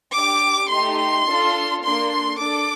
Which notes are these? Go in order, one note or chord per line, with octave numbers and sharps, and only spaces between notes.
D4 G4 D6
A3 D#4 G4 C6
C6
D4 F4 A4
A#3 D4 A4 C6
C6
D4 A4 D6